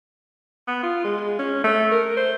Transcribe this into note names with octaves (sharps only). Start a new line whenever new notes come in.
B3
F4
G#3
C#4
A3
A#4
C5